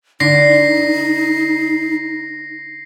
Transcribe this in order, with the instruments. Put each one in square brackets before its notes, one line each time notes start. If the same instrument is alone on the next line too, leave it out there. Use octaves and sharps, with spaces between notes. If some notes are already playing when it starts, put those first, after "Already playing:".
[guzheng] D3 [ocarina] D#4 [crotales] A#6 C7